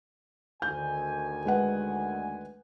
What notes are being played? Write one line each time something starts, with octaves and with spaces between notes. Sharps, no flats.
D2 D#3 G#5 G6
G#3 B4 F#5